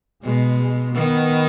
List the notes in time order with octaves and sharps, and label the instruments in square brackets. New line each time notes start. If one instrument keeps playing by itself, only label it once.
[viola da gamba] B2 [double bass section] G#3
[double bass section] G#3
[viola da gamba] D#3 [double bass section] B3